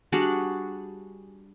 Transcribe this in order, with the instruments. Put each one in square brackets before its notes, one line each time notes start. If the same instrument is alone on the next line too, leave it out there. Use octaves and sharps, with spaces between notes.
[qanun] G3 D4 F#4 G#4